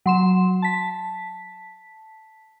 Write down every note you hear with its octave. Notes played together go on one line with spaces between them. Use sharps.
F#3 C6 E7
A5 B6